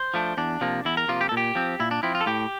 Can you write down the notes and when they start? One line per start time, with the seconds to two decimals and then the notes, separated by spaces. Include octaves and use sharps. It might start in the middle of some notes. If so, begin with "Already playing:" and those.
Already playing: C5
0.14 F3 A3 D4
0.37 E2 D4
0.61 C3 F3 A#3
0.85 E2 E4
0.97 A#4
1.08 C3 F3 A#3 F4
1.21 G4
1.29 A4
1.32 A#2
1.37 G4
1.55 F3 C4
1.80 A#2 E4
1.91 D4
2.03 F3 C4 E4
2.15 F4
2.21 A4
2.26 A2 G4